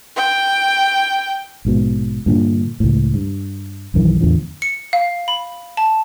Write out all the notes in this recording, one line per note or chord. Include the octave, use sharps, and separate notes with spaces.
G5
A#1 G#2 B2
G2 A#2 D3
C#2 A2
G2
B1 F#2 D#3 E3
E2 A2 D3 F3
C#7
F5
B5
A5